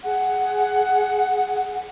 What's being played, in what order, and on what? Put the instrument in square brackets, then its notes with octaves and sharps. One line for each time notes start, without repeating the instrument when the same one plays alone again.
[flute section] G#4 F#5